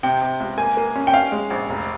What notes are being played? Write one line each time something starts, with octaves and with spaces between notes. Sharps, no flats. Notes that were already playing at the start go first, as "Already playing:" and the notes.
C3 G5
C3
C#2
A#3 G#5
A#3
C#4
G5
C#4 F5
G#3
A#1
F1